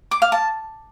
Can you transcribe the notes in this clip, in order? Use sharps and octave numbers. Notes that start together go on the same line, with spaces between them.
D6
F5
A5